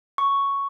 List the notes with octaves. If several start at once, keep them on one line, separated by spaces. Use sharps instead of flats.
C#6